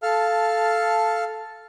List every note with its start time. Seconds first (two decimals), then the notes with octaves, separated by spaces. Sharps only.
0.03 A4 F5 A5 F6